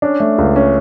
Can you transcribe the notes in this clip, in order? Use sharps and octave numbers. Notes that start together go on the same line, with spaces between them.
C#4 D4
A3
C#2
C#4